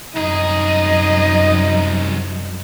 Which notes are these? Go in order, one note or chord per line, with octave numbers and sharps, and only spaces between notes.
C2 F#2 D#4 G#4 D#5